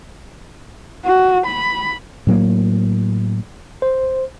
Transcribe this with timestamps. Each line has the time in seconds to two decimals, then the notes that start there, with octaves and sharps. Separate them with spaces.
1.05 F#4
1.46 B5
2.27 A2 F#3 A#3
3.82 C5